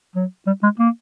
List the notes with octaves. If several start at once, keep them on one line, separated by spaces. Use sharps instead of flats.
F#3
G3
G#3
A#3